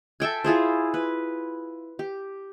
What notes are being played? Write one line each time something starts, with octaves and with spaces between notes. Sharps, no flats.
A4 E5 G5 G#5
E4 F4 G#4 C5
B4
G4